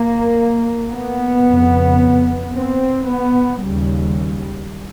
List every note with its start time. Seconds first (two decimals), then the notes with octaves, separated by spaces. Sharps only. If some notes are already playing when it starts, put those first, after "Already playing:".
Already playing: A#3
0.92 B3
1.46 F2 C#3
2.55 C4
3.09 B3
3.63 D#2 C#3 G3